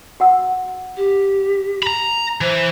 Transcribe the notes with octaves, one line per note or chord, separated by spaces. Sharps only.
F#4 F#5 E6
G4
A#5 B5
E3 C5